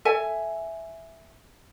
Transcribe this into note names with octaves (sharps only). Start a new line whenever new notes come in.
A4 E5 G#5